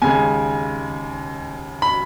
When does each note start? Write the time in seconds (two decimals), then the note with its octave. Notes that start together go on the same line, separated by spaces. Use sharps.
0.02 D#2 C#3 G#3 G#5
1.82 B5